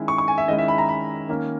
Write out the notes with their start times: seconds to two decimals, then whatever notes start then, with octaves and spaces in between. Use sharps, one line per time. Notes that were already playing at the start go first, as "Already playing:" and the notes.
Already playing: D#3 G#3 C#4 E4
0.08 C#6
0.18 C#6
0.28 G#5
0.38 E5
0.48 D#3 G#3 C#4 E4 D#5
0.58 E5
0.68 B5
0.78 A#5
0.89 B5
1.29 D#3 A#3 C#4